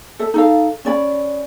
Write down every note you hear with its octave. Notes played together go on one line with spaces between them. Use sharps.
A4 E5
D#4 A4 F5
C#4 D5 B5